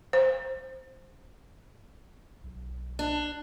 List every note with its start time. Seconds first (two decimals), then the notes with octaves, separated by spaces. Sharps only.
0.13 C5
2.44 B1
2.99 D4